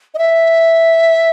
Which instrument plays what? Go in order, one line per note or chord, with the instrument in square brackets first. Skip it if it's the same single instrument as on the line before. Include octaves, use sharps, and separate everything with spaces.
[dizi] D#5
E5